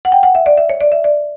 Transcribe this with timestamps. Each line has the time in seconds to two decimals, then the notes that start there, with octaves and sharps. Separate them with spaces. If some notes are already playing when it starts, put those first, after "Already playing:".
0.05 F#5
0.12 G5
0.23 F#5
0.35 E5
0.46 D5
0.57 E5
0.70 C#5
0.81 D5
0.92 E5
1.04 D5